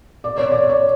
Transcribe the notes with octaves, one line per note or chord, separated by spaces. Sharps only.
D5
C#5
D5
C#5